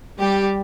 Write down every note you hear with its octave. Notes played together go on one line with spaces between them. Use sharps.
G3 G4